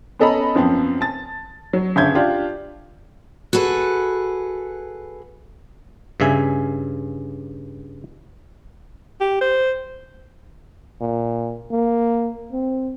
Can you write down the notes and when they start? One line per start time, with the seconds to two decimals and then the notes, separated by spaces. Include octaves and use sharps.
0.19 B3 C#4 A4 D#5 A#5 B5
0.55 F#2 F3 B3 C4
1.01 A5 A6
1.73 F#3 C#5
1.96 G1 C#3 E5 A5 G6 G#6
2.15 D4 F4 G4
3.53 F#4 G#4 A4 B4
6.20 G2 C#3 E5 G#5
9.21 G4
9.41 C5
11.01 A#2
11.71 A#3
12.52 C4